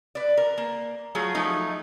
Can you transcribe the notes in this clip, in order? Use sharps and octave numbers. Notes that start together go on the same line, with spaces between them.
B4 D5
A#4
A#3
F#3 A3 F4 G#4
F3 F#3 A3 D#4